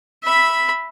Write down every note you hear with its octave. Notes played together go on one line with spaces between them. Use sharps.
E5 B5